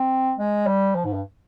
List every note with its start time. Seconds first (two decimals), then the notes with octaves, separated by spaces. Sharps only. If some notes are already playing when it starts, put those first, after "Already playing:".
Already playing: C4
0.39 G#3
0.67 G3
0.95 F3
1.05 G#2
1.13 G2